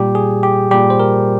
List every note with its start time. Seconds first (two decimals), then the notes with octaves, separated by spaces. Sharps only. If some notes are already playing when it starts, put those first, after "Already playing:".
Already playing: A#2 G3 G4
0.15 G#4
0.43 G4
0.71 A#2 G3 G4
0.90 C5
1.00 A#4